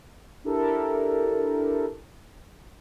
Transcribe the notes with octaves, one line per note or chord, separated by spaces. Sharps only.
D4 E4 G4 A4 A#4